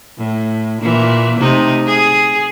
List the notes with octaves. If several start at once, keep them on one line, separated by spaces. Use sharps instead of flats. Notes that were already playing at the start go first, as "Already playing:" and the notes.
A2
A#2 E3
C3 A3 D#4
G#4